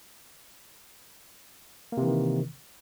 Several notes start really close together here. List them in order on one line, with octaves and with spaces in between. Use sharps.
A#3 C3 E3 D#3